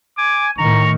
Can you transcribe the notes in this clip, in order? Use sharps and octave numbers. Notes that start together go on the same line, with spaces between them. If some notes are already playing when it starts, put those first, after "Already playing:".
G#5 D6
A2 D#3 A#5 C#6